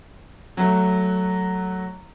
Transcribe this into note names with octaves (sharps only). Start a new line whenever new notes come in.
F#3 A3